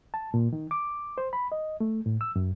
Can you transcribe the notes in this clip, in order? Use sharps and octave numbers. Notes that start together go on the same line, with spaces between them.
A5
A#2
D#3
D6
C5
B5
D#5
A3
A2
E6
F#2